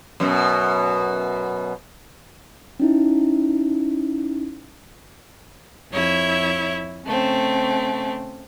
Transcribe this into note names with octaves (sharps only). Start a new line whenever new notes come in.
F#2 B2
C#4 D#4 E4
F2 E4 C#5 E5
C#3 A3 C4